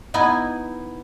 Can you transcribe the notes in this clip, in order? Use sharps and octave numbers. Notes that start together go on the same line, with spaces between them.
B3 D#4 E4 G#5